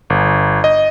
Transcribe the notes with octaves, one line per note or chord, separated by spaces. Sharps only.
G1
D#5